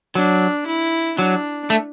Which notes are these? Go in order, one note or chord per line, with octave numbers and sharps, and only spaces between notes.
F#3 D4
E4
F#3 D4
A3